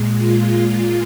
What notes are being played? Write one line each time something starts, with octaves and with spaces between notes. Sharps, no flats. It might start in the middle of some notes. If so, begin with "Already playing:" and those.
Already playing: A#2 G#3
F4